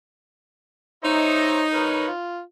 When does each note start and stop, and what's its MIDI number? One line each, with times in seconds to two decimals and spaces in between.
1.04 2.09 63
1.04 1.63 72
1.04 1.63 73
1.04 1.63 76
1.74 2.08 70
1.74 2.08 71
1.74 2.08 73
2.08 2.40 65